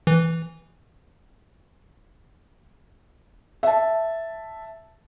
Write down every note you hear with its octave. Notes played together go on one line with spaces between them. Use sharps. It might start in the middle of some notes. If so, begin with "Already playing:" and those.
E3
E5 A5